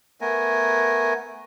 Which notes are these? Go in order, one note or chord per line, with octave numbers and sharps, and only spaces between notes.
A3 B3 A#4 G#5